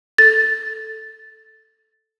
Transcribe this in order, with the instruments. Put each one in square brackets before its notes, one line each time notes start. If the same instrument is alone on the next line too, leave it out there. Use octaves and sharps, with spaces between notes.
[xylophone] A4 A6